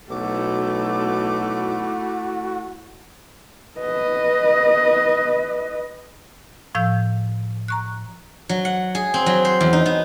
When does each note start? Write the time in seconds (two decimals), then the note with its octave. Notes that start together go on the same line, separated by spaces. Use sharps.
0.10 B1 A3 E4 F#4 D6
3.81 B4 D#5
6.75 A2 F3 F5 E6 G6
7.68 A#5 C#6 F#6
8.49 F#3
8.65 F#5
8.95 G#4
9.14 C4
9.26 F#3
9.45 C5
9.61 E2
9.73 D#4
9.86 B3